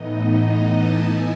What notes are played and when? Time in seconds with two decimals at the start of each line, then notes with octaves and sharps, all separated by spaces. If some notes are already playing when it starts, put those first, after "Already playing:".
Already playing: A2 E3 B3 D#4 D#5
0.44 D#5
0.72 A5
1.00 E3 B3 E4 G#5